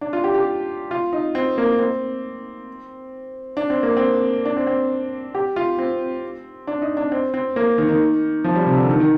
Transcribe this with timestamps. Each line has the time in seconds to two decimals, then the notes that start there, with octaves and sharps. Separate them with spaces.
0.01 D4
0.13 F4
0.24 G4
0.35 G4
0.91 F4
1.13 D#4
1.35 C4
1.58 A#3
1.79 C4
3.57 D4
3.70 C4
3.83 A#3
3.97 C4
4.45 D4
4.57 C4
4.67 C4
5.35 G4
5.56 F4
5.78 C4
6.67 D4
6.82 D#4
6.97 D4
7.12 C4
7.34 C4
7.56 A#3
7.78 D#3
7.89 D#3
8.44 F3
8.56 G3
8.67 C3
8.77 D3
8.89 D#3
9.00 D#3